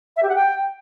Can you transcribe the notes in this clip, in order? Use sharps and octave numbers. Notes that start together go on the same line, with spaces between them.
E5
G4
F#5
G5